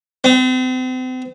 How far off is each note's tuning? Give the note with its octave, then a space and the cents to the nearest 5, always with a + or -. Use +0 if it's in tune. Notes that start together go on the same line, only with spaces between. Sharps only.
C4 -40